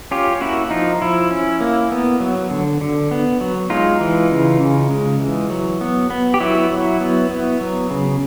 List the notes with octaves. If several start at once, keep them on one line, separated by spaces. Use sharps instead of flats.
C#4 F4 G4
A#3 E4 F#4
F3 D#4 F4
F3 E4
C#4
A#3
B3
F#3
D3
D3
B3
F#3
G#3 D#4 F4
E3
C#3
C#3
G#3
E3
F#3
B3
B3
G4
F#3 E4 F#4
F#3
B3
B3
F#3
C#3